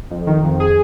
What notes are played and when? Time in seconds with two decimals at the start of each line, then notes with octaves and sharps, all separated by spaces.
0.11 F2
0.27 D#3
0.43 F2
0.60 G#4